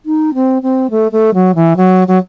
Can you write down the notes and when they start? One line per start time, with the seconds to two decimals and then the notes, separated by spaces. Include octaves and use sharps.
0.06 D#4
0.34 C4
0.62 C4
0.90 A3
1.12 A3
1.34 F#3
1.55 E3
1.77 F#3
2.08 F#3